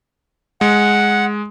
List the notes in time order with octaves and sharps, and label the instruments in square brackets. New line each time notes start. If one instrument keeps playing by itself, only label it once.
[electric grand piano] G#3 [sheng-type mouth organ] F#5